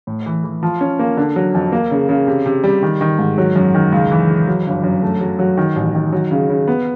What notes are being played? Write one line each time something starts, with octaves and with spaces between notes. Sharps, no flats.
A2
E3
E3
F3
C#4
A#3
D3
F#3
F2
A#3
C#3
C#3
C3
C3
G3
D#3
D#3
G#2
F#3
F#2
D#3
C#2
E3
E3
F#3
G1
F#2
A3
F#3
F#3
D#3
A1
D#3
F#3
C#3
C#3
B3